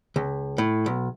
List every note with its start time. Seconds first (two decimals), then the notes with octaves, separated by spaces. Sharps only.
0.16 C#2
0.58 A2
0.86 B1